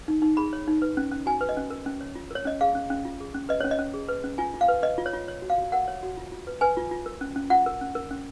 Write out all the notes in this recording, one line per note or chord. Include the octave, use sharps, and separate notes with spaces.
D#4
D#4
G#4 B5
C#5
D#4
B4
C#4
C#4
F#4 G#5
B4
D#5
C#4
A#4
C#4
C#5
F4
A#4 C#5
C#4 D#5
G#4 F5
C#4
C#4
F4
G#4
C#4
B4 D#5
C#4 C#5
D#5
C#4
G#4
B4
C#4
F4 G#5
F4
F5
B4
B4 D#5
F4
C#5
F4
C#5
F#4
F5
F#4
A#4 F#5
C#5
F#4
F4
F4
B4
B4 G#5
F4
F4
A#4
C#4
C#4
F4 F#5
A#4
C#4
A#4
C#4